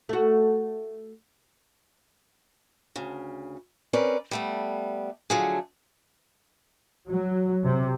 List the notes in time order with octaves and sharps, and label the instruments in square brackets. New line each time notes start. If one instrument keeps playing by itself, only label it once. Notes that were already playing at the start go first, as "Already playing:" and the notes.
[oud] A3 F#4
[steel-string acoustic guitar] D2 C#3
C4 C#4 A#4 B4 D5
G3 A3 B3
D3 F3 F#3 A3 G#4
[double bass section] F#3
C3